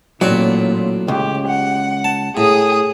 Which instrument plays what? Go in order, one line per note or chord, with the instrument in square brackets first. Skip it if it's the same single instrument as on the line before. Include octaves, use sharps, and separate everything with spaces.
[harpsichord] A1 C4 D5 [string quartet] A#2 [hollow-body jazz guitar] F#3
[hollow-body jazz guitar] C#2 [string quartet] G4
[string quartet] F#5
[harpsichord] A5
[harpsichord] A2 [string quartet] G#4 D#6